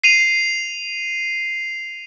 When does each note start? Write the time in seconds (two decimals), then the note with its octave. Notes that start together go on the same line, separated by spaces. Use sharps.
0.04 C7 D#7 F7